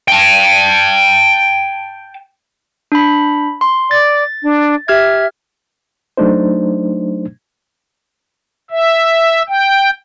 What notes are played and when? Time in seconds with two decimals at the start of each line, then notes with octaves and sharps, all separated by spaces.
0.08 G5 A5
2.92 D4 B5
3.61 C6
3.91 D5 A6
4.43 D4
4.88 G4 E5 F6 G#6
6.17 F#3 A3 D4 D#4 C5
8.71 E5
9.49 G5